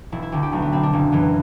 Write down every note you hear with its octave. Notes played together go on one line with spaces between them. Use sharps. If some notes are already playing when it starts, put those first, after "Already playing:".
E1 E4
E4
D2 D3 G4
G4
B1 A3
B3
B2 C4
D4
F#1
F#2 E3 B3